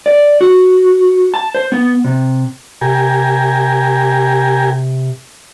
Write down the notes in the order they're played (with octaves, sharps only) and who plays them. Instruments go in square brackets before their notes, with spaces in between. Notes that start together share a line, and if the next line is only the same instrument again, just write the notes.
[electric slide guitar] D5
F#4
A5
C5
B3
C3
[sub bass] C3 [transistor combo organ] G4 A#4 G#5